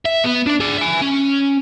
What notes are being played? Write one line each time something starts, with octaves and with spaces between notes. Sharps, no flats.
E5
B3
D4 D5
G#4 D5
E5 G#5
C#4